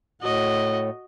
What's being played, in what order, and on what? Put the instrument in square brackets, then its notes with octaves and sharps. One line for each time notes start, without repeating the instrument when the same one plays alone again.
[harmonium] A2 [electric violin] F#4 D#5